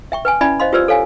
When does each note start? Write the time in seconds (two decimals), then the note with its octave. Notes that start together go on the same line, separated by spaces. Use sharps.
0.12 E5 G5 C#6
0.25 B4 G5 G#5
0.41 C#4 E4 D5 E5 G#5 B5
0.60 C5 D#5 F5 C6
0.73 F4 G4 B4 C5 D5 E6
0.88 A4 C#5 F5 G#5